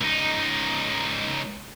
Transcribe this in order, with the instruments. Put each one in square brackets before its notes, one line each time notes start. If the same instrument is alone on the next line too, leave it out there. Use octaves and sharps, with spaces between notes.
[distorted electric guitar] C#2 D#4